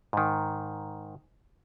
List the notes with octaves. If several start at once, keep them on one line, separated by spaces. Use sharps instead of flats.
G#2 D#3